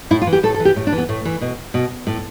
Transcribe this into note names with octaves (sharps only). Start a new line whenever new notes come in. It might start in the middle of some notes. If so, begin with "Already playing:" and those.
A2 E4
F4
E3
G4
A2 A4
A4
E3
G4
A2
D4
E3
B3
A2 A3
E3
B2
B2
A2